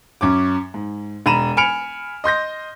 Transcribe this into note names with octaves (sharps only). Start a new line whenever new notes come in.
F#2 C#4 D6
G#2
E1 A#5 B5 D#7 E7
G#5 B5 F6 C#7 D7 F7
D#5 C6 G6 A#6